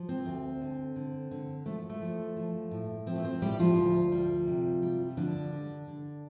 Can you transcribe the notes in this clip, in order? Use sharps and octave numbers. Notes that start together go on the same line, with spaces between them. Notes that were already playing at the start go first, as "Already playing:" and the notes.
Already playing: F3
C4
D2
D3
D3
D3
F3 A3
A3
F3
F3
A2
F3 C4
A3
C4
A2 G3 G4
F3 F4
D2
G3
C3
G3
D3 F3 D4
D3
D3